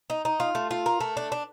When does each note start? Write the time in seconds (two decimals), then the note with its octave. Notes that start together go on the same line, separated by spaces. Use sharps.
0.10 D#4
0.25 D#4
0.40 F4
0.55 A3
0.71 F4
0.86 A#4
1.00 A3
1.17 D4
1.32 D4